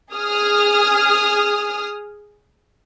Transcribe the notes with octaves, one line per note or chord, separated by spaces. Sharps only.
G#4 D#6 F6